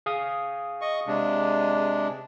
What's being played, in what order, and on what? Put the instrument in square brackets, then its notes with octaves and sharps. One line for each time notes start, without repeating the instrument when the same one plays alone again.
[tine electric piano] G#4 F5 D#6
[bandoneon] D#5 C#6
C3 G#3 D4